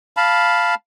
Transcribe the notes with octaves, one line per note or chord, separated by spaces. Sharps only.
F5 A5 B5